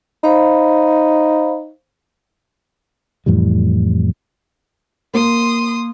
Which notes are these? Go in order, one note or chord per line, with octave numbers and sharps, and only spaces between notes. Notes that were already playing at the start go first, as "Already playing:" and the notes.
D#4 C5 F5 B5
F2 A2 E3 G3
A#3 C6 D#6